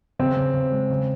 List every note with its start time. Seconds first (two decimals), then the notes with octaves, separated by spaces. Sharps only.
0.19 C#3 C4
0.37 C#3
0.54 C#3
0.72 G#3
0.90 C#3